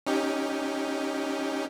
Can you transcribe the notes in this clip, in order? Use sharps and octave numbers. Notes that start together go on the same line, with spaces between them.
C#4 D#4 G4